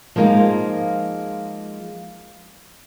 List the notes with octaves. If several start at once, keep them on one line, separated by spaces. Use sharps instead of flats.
F3 G#3 A#3 D#4 F4